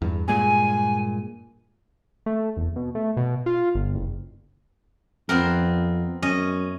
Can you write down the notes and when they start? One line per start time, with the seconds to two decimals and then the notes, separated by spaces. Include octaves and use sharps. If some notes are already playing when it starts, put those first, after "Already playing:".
0.02 E2 G2
0.28 G2 A#2 G#3 G#5
2.26 A3
2.57 E1
2.76 B2
2.95 A3
3.17 B2
3.46 F4
3.75 G1
3.95 F#1
5.29 F2 B3 C4 A#4
6.22 F#2 C#4 D#5